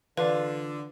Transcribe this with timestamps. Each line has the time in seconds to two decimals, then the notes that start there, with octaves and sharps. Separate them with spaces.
0.17 D3 E3 F4 B4 D5